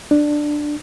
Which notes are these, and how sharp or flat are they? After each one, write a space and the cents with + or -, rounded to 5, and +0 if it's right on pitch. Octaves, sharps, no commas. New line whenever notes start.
D4 +10